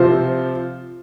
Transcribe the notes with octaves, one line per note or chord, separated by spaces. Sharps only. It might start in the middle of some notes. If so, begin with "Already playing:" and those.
Already playing: C3 F3 C4 F4 C5